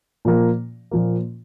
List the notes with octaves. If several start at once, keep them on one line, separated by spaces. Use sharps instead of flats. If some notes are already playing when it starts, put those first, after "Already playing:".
A#2 F3 A#3
A#2 F3 A#3